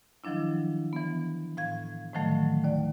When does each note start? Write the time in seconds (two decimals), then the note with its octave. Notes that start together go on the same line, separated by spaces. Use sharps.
0.24 D#3 F3 F#3 D4 E4
0.93 E3 B3
1.57 A2 F5 G#6
2.14 A2 D3 D#3 F3 F#3 A3
2.64 D#2 D5